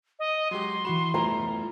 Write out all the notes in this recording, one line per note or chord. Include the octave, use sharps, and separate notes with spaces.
D#5
F#3 G#3 G4 C6
E3 F#4 B5 E7
G3 A3 B3 E4 F4 A#5